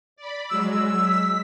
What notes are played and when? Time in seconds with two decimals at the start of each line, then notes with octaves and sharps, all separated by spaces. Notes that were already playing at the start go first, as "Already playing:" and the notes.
0.16 D5 B5
0.50 F#3 G#3 E6
1.01 B6